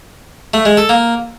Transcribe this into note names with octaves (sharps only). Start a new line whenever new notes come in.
A3
G#3
A4
A#3